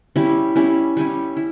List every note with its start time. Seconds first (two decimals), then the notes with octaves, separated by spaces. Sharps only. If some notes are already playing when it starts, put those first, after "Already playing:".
0.16 G3 C#4 E4
0.56 G3 C#4 E4
0.97 G3 C#4 E4
1.37 E4